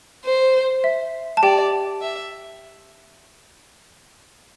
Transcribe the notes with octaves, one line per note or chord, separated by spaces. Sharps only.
C5
E5
A5
G4 D5 G5
E5